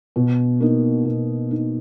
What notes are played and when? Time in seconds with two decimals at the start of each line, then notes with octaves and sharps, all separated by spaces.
0.16 B2
0.61 A#3 D#4
1.05 B2
1.51 A#3 D#4